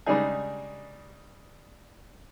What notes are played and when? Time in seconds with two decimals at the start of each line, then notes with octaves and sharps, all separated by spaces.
0.06 C#3 G3 G#3 D4 D#4 G#4